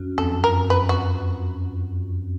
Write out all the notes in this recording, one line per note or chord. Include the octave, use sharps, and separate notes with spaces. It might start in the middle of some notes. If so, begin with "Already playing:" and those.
Already playing: F#2
F2 A4
F#2 A#4
B4
F#4